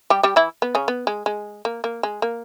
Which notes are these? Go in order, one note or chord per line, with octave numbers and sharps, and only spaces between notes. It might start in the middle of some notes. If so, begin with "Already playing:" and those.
G3 G4
G3 G4
E3 E4
B3
C#3 C#4
B3
G#3
G#3
A#3
A#3
G#3
A#3